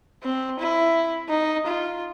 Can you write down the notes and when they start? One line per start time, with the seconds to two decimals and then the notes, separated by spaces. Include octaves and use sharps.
0.23 C4
0.60 E4
1.29 D#4
1.67 F4